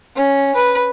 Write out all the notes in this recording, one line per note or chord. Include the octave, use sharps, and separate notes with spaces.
C#4
B4